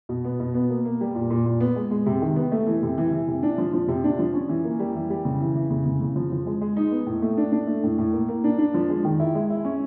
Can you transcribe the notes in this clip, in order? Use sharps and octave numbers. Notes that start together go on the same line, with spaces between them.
B2
B3
B2
B3
A#3
A#3
G3
A#2
A#2
A#2
B3
G#3
G#3
C3
D#3
B3
A3
E3
C3
E3
E3
C3
D4
F3
F3
C3
D4
F3
C#4
E3
A#3
G3
E3
G3
C#3
E3
E3
C#3
C#3
C#3
F3
F3
G#3
G#3
D#4
B3
A2
A3
D4
D4
A3
A2
A2
A#3
A#3
D4
D4
F3
G#3
D#3
E4
G#3
E4
C#4